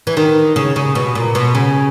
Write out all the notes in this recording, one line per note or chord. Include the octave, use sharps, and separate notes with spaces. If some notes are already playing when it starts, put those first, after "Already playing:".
E3
D#3
C#3
C#3
B2
A#2
B2
C#3